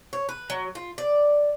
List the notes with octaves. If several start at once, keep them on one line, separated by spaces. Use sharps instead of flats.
C#5
B4
F#3
F4
D5